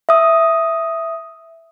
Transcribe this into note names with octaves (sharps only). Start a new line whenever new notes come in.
E5 D#6